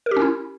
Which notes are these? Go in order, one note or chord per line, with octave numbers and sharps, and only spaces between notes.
A#4
G4
C#4
E4